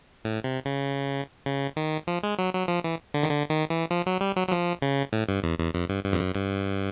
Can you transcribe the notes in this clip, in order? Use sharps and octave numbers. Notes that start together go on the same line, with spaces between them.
A2
C3
C#3
C#3
D#3
F3
G#3
F#3
F#3
F3
E3
D3
D#3
D3
D#3
E3
F3
F#3
G3
F#3
F#3
F3
C#3
A2
G2
E2
E2
F2
G2
G2
F2
F#2
G2